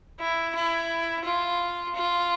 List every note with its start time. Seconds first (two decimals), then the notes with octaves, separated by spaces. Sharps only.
0.20 E4
0.55 E4
1.25 F4
1.95 F4